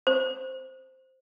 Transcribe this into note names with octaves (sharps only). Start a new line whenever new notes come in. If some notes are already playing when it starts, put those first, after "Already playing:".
C5